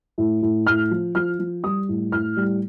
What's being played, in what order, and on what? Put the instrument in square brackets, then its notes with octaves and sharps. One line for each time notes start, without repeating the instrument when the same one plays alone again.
[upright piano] A2
A2
A2 F6
F3
F3 F6
F3
G3 D#6
A2
A2 F6
G3